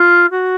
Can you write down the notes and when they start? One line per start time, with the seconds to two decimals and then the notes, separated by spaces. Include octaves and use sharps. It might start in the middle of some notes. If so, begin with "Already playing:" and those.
Already playing: F4
0.30 F#4